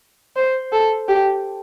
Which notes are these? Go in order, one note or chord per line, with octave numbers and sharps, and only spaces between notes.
C5
A4
G4